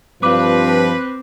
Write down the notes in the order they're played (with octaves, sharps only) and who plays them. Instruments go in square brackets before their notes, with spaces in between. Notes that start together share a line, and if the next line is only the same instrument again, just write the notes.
[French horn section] G2 F3 [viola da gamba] C4 [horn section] B4 [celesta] D6